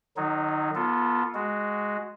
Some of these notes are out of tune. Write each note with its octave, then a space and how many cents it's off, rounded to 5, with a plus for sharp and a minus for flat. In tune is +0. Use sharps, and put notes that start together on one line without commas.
D#3 -40 F#3 +0 D#4 +0
B3 -30 F4 +0 A4 +10
G#3 +0 F#4 +0